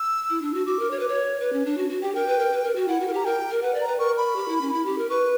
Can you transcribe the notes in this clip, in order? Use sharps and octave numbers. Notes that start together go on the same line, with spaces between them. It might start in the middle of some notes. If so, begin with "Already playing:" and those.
Already playing: E6
E4
D4
F#4
F#4 D6
A#4
C#5
B4
C#5 D6
B4
C#4
D4
F#4
F#4
G4 G5
A#4 G5
B4
A#4
B4
A#4
F#4
E4 F#5
F#4
A#4
G4 A#5
A#4 G5
A#4
B4 F#5
D5
A#5
B4
A#4 C#6
B5
G4
E4
C#4
E4
G4
A#4
B4 C#6